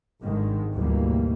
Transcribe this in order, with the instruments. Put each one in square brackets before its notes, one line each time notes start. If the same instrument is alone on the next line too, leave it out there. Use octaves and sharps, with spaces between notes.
[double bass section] G#1 G#2 D3 D#3 G#3
D2 G#2 B2 E3 G3 A#3